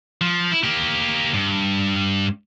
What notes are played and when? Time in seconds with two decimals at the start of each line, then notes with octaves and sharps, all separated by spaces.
0.21 F3
0.52 E4
0.64 A#3 G4
1.34 G2